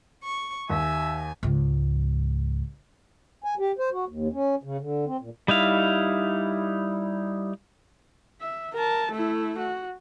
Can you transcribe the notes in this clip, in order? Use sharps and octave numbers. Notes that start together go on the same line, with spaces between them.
C#6
D#2 E5 G#5
C#2 G#2
G#5
G4
C5
F#4
D#2
C#4
C#3
D3
C4
A#2
G3 D#4 E4 F5
E5
A#4 A5
A3 E4
F#4